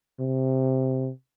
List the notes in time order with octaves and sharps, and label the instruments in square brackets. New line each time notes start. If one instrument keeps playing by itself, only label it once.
[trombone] C3